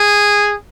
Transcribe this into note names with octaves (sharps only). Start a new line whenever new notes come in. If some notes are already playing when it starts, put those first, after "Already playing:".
Already playing: G#4